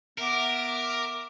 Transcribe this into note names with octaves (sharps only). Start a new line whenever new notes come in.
B3 A#4 E5 D6